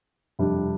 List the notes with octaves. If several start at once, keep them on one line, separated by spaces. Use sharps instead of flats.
F2 C3 G3 D4